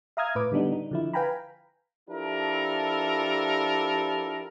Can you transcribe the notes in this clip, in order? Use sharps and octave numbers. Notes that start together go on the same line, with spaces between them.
E5 F5 A#5 D#6 F6 G#6
A2 B4 D6
D3 G3 B3 D4 D#4
D#4
D3 F3 E4
B4 F5 G5 G#5 A#5 B5
F3 D4 E4 G4 A4 A#4